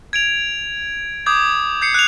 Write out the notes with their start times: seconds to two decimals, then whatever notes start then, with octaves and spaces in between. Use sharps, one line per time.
0.13 G#6 D7 F7
1.26 D6 D#6 G6 G#6
1.82 G6 C7 C#7
1.94 F#6 F7